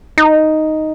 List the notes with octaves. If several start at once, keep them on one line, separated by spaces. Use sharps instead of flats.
D#4